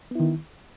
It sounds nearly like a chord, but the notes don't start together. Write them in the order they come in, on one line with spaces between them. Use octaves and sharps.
B3 E4 D#3